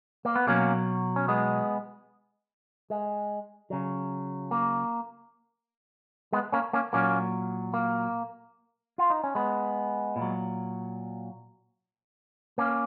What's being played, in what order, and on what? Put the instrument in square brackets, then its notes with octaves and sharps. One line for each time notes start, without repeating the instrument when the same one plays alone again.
[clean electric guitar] A#3
B3
B2 F#3 A#3 C#4
C#4
G#3 B3
G#3
C#3 F#3
A#3
G#3 B3
A#3 C#4
A#3 C#4
A#2 F#3 A#3 C#4
A#3
F4
D#4
C#4
G#3 B3
A#2
F#3
A#3 C#4